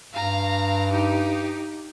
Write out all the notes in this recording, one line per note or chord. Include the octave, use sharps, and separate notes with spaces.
G2 F5 A#5
D#4 G4